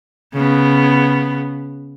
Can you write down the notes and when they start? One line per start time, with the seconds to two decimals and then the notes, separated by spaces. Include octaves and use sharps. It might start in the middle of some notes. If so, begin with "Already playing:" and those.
0.34 C#3 B3